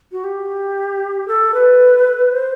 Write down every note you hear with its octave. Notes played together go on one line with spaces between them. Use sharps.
F#4
G4
A4
B4
C5